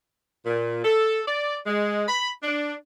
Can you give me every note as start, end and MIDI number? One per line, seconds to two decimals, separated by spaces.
0.46 0.80 46
0.84 1.23 69
1.26 1.57 74
1.66 2.04 56
2.08 2.30 83
2.43 2.73 62